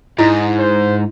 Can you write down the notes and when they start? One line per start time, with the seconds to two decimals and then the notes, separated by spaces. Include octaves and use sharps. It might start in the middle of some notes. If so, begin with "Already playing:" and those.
0.18 G#2 D#4 E4 B5
0.59 C5